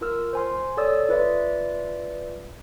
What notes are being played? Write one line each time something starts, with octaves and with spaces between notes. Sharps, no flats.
F4 A#4 E6 F6
C5 G#5 C6
A4 C#5 D5 D#6 E6
F4 B4 D5 E5